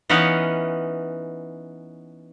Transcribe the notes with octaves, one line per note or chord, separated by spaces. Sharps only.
E3 B3 C#4 D#4 F5 F#5